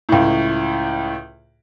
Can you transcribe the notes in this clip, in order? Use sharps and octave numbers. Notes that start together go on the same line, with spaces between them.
C#2 A2